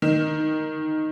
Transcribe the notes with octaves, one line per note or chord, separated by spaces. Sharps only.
D#3